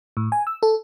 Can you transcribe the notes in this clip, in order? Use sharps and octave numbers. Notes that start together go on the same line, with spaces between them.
A2
G#5
E6
A4